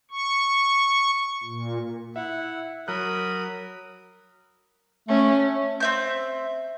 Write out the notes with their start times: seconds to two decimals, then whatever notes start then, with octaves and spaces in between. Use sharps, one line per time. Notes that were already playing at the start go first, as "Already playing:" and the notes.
0.11 C#6
1.44 A#2
2.16 E4 E5 F#5
2.88 F#3 A#4 B5 D#6 F#6
5.08 A3 C#4
5.80 C4 E5 G6